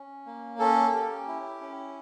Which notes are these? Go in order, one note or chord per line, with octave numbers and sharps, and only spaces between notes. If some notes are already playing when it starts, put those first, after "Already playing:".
Already playing: C#4
A#3
C#4 A4
G4
E4
C#4